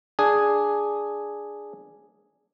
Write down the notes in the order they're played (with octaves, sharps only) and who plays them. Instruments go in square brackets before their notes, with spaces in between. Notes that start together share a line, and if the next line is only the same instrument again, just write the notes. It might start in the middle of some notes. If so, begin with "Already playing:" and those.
[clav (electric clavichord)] D4 G#4